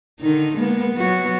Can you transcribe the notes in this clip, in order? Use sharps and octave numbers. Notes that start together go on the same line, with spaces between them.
D3 D#3 D#4
G#3 A#3 B3
F#3 B3 F#4